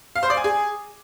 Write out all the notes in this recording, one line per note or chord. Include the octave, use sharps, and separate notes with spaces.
F5
C5
D5
G#5
G#4